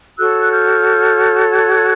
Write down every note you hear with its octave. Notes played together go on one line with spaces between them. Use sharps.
F#4 A4 C#5 E6 F#6
F#6
F6 G6
F#6 G#6